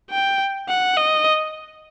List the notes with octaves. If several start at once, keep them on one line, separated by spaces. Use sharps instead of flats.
G5
F#5
D#5